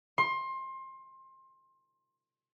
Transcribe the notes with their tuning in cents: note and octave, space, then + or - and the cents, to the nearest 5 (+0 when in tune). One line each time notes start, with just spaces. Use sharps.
C6 +25